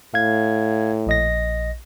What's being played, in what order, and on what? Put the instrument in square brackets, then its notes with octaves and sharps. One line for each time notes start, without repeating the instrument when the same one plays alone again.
[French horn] A2 [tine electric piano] F5 G#6
[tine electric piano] A#1 D#5 A#6